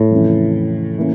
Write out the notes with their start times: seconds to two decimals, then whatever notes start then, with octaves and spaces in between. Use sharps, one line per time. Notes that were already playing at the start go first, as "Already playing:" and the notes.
Already playing: A2
0.11 F2 C#3 E3
0.98 E3 A#3 C#4